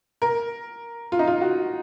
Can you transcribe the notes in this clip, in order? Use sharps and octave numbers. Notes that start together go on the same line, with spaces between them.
A#4
F4
D#4
F4
F#4